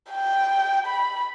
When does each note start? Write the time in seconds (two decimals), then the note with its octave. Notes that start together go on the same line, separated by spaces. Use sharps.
0.11 G5
0.86 B5